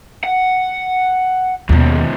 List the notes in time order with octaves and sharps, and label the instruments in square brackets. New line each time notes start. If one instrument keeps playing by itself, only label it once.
[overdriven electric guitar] F#5
[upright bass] D#2 B2 [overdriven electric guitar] G#2 F3